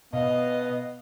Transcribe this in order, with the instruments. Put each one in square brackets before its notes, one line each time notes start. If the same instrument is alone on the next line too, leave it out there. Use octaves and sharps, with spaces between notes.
[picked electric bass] B2 [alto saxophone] B3 [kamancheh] D#5 [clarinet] F5